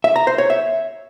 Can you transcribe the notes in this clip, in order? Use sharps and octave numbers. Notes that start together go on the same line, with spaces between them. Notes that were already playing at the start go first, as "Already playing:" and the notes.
E5
A#5
C5
C#5
E5